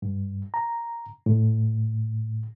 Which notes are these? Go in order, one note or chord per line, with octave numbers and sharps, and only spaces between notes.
G2
A#5
A2